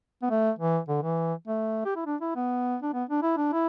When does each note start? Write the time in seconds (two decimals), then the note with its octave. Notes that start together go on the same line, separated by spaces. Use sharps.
0.23 B3
0.30 A3
0.59 E3
0.89 D3
1.03 E3
1.48 A3
1.85 G4
1.96 E4
2.06 D4
2.21 E4
2.36 B3
2.82 D4
2.94 B3
3.09 D4
3.23 E4
3.37 D4
3.53 E4